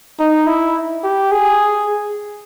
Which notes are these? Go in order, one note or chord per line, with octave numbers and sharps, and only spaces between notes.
D#4
E4
G4
G#4